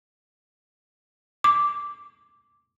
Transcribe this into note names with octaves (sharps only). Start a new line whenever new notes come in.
D6